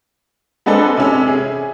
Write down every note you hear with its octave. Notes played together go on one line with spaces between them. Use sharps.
G#3 B3 C4 D4 A4
C3 C#4
G#4